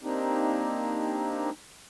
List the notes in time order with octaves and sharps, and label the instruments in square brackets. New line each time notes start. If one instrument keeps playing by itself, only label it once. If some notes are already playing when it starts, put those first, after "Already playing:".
[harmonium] A#3 C4 D4 D#4 G4